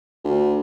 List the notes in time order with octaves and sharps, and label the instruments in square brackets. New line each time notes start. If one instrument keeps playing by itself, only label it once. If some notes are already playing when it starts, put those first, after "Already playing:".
[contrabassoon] D2